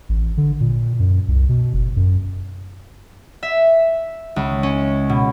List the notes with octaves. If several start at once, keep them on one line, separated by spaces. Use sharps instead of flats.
A1
D3
A#2
F#2
C2
B2
F#1
F#2
E5
C#2
C#4
B2